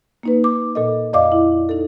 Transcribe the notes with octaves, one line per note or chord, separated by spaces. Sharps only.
A#3 D#4 B4
D6
A#2 A4 D#5
F2 D5 D#5 F5 D6
E4
D#4 A4